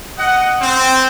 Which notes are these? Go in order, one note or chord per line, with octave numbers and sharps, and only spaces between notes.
D#5 F#5
C4